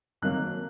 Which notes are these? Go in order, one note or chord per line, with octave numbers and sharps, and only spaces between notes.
F2 D#3 F#3 A#3 F#6